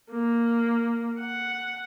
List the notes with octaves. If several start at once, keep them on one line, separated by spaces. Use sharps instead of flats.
A#3
F#5